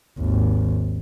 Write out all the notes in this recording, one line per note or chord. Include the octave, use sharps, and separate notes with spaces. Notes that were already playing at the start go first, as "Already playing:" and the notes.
G#1 D#2